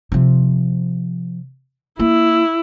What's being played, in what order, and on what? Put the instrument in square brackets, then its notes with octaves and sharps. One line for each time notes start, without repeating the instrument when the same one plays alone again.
[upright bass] C3 F3
[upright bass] A#3 [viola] E4